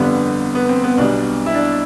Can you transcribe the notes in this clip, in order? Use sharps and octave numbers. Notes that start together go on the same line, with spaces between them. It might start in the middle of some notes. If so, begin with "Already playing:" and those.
Already playing: G1 F2 D3 G3 B3
B3
C4
B3
B1 B2 G3 D4
E4
D4